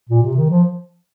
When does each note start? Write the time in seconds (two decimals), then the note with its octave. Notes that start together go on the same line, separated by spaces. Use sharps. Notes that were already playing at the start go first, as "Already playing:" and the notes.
0.09 A#2
0.23 C3
0.36 D#3
0.50 F3